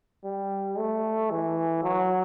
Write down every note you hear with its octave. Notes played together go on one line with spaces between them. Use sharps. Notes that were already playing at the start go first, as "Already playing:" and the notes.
G3
A3
E3
F#3